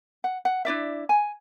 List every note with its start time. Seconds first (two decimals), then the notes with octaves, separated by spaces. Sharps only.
0.24 F#5
0.45 F#5
0.65 D4 E4 D5 E5
1.09 G#5